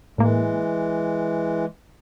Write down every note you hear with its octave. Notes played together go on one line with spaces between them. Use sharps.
A2 E3 G#3 A#3